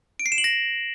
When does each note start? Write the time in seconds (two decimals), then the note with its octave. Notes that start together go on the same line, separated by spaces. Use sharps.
0.19 D7
0.26 C7
0.32 E7
0.38 F#7
0.44 A#6